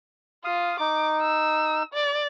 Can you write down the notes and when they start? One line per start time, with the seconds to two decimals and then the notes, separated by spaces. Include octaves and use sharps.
0.44 F4 F5 D#6
0.80 D#4 D6
1.22 E6
1.94 D5